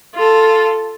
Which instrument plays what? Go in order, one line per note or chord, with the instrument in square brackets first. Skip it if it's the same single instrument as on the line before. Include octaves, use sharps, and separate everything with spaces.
[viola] F4 A4